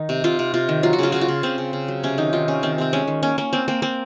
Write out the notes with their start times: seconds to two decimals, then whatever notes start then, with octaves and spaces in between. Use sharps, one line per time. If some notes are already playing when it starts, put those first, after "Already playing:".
Already playing: D#3 D#4
0.09 C3
0.24 C3 F4
0.39 C3
0.54 C3 F4
0.69 D#3
0.83 F#3 F4
0.93 F#4
0.99 C#3 F4
1.12 C#3 F#4
1.21 F4
1.28 C#3
1.43 C#3 C4
1.58 C#3
1.73 C#3
1.88 F#3
2.03 C3 C#4
2.18 D#3 D#4
2.33 D#3 F4
2.48 C3 C#4
2.63 D#3 C4
2.78 C3 C4
2.93 G#3 C#4
3.08 D#3
3.23 A#3 C#4
3.38 A#3 C#4
3.53 A#3 C4
3.68 A#3 C4
3.82 A#3 C4